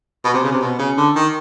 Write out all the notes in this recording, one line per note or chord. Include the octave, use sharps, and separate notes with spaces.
B2
C3
C#3
C3
B2
C#3
D3
D#3